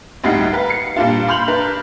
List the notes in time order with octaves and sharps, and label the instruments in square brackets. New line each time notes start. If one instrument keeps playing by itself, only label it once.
[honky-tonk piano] D2 A2 G3 D#4 F#5 C7
A#4 B4 F5
C7 C#7
A#2 G3 A#3 D4 F4
B5 C6 F6 G6 F7 F#7
D4 A#4 B4